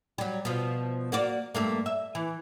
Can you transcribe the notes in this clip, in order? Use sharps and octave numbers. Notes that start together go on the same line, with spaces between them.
F#3 G3
B2 F3
A#3 F#4 D5
G2 A3 A#3
E5
E3